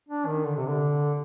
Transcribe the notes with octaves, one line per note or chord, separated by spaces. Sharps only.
D4
D#3
D3
C3
D3